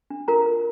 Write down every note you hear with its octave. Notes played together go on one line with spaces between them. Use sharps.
D4
F4 A#4 A#5
A#4